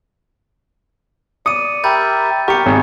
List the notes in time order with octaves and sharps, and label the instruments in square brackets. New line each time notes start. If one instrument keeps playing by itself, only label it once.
[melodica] D5 [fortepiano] D#6 [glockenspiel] C#7 D#7
[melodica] G4 A#4 E5 [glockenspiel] B5 G6 A6
[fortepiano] G4 [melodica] A#4 [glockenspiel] C#6 C#7
[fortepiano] G#1